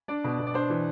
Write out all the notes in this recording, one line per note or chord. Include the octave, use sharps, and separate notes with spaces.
D4 D5
B2
B2
D5
D4 C5
E3